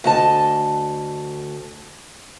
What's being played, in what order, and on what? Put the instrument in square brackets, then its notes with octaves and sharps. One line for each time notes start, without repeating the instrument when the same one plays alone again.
[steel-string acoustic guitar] D2 D#5 A5